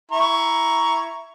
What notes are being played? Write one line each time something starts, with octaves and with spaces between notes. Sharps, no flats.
E4 A#5 C#6